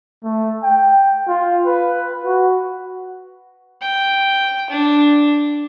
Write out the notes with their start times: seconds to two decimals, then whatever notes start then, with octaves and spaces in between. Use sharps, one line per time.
0.24 A3
0.63 G5
1.28 F4
1.66 B4
2.24 F#4
3.82 G5
4.70 D4